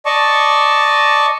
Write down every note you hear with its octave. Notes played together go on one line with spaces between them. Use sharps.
D5 D#5 A5 C#6